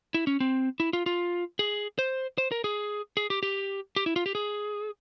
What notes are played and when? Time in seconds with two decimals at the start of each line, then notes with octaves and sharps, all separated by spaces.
0.14 E4
0.27 C#4
0.40 C4
0.80 E4
0.93 F4
1.06 F4
1.59 G#4
1.99 C5
2.38 C5
2.52 A#4
2.64 G#4
3.17 G#4
3.30 G4
3.43 G4
3.96 G4
4.06 E4
4.16 F4
4.26 G4
4.35 G#4